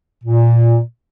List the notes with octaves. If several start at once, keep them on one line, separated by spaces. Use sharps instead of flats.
A#2